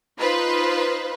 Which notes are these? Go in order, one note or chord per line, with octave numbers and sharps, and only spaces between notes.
D#4 F4 B4 C5